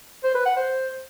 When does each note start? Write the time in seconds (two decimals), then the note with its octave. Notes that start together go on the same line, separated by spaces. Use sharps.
0.24 C5
0.35 B4
0.46 F#5
0.57 C5